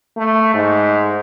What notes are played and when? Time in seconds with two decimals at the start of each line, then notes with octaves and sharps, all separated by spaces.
0.17 A3
0.54 G#2